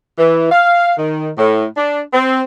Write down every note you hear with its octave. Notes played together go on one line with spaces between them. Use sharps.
E3
F5
D#3
A2
D4
C4